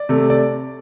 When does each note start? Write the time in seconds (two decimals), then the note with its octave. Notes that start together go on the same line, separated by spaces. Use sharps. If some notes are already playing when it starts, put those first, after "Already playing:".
Already playing: D5
0.09 C3 A3
0.30 D5